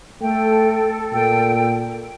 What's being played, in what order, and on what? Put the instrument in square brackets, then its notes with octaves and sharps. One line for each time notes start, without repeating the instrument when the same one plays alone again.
[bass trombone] A3 [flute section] A4 [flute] G5
[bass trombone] A#2 [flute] G5